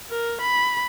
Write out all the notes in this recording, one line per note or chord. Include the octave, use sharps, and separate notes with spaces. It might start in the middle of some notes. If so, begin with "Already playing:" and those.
A#4
B5